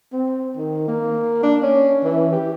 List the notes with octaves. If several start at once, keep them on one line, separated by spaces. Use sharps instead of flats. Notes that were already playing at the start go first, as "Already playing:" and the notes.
C4
D#3
A#3
D4
C#4
E3
G4